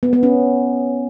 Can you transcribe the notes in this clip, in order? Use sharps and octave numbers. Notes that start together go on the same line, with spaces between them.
B3
B3
C#4